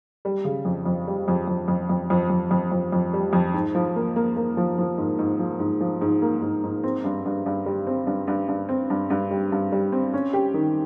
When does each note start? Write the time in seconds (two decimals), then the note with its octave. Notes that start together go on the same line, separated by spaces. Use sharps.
0.25 G3
0.45 C#3
0.65 F2
0.86 F2
1.07 G3
1.28 F2
1.48 F2
1.68 F2
1.89 F2
2.10 F2
2.30 F2
2.51 F2
2.72 F2
2.92 F2
3.13 G3
3.33 F2
3.53 G#2
3.75 F3
3.96 A#3
4.16 A#3
4.36 A#3
4.57 F3
4.78 F3
4.98 G#2
5.19 G#2
5.39 F3
5.60 G#2
5.80 F3
6.01 G#2
6.22 A#3
6.42 G#2
6.63 G#2
6.84 C4
7.04 G2
7.25 G2
7.46 G2
7.66 G3
7.87 C4
8.07 G2
8.27 G2
8.48 G2
8.69 C4
8.90 G2
9.10 G2
9.31 G3
9.52 G2
9.72 G3
9.93 C4
10.13 C#4
10.33 G4
10.54 D#3